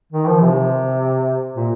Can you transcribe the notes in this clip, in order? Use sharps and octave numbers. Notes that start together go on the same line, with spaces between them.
D#3
F3
C3
A#2